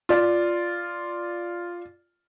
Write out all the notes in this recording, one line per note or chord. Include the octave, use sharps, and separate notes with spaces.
F4 D5